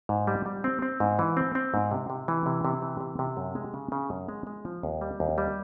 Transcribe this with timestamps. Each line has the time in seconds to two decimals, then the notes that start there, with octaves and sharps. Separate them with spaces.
0.09 G#2
0.27 G3
0.46 G3
0.64 C4
0.82 C4
1.00 G#2
1.19 E3
1.37 C4
1.55 C4
1.74 G#2
1.91 C3
2.10 C3
2.28 E3
2.46 C3
2.65 C3
2.82 E3
3.01 C3
3.19 C3
3.37 F#2
3.55 G#3
3.74 C#3
3.92 C#3
4.10 F#2
4.29 G#3
4.47 G#3
4.65 F3
4.83 D#2
5.01 G3
5.20 D#2
5.38 G3